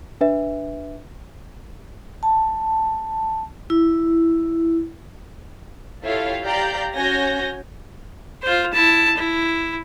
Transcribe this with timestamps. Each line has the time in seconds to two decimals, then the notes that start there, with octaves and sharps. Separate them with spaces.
0.21 D4 B4 E5
2.23 A5
3.70 E4
6.04 E4 F4 G4 A4 C#5 F5
6.45 G4 D5 F5 A#5 G6
6.96 C#4 F#4 C#5 G#5 G6 A#6
8.43 F4 C5
8.73 E4 A5
9.17 E4